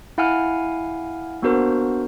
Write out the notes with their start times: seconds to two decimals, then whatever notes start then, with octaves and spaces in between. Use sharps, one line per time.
0.18 E4 F5 F#5 G#5 F6
1.42 A#3 B3 D4 F#4 A#4 C5